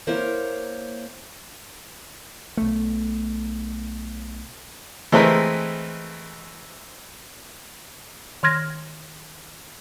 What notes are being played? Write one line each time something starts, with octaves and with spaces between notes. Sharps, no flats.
A#3 E4 A#4 C5 C#5
B1 A3
E3 G#3 A3 C4 A#4 B4
D#3 C6 F6 G#6 A#6